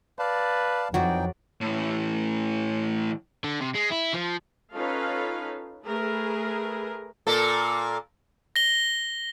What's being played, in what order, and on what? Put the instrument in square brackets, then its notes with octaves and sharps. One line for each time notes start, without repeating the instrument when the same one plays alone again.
[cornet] B4 [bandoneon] D5 F5 A5
[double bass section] F2 [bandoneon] E3 D#4 G5 [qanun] F#3 F#4 D5
[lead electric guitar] A2 E3
[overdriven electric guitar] D3
C3
G#3
E4
F3
[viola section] C#4 D#4 F4 A4 B4 F5
A3 G#4 A#4 B4
[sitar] A#2 A#3 A4
[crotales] A#6 G7